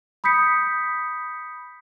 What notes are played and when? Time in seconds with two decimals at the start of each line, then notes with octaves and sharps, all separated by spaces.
0.24 B5 D#6 G6 B6 C#7